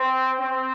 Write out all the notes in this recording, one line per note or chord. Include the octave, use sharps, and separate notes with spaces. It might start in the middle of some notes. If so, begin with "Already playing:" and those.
Already playing: C4
C4